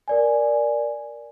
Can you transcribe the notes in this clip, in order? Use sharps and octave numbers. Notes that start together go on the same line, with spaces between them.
A#4 D5 G#5